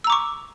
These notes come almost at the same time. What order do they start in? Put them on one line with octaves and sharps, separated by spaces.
E6 A#5 D6 C#6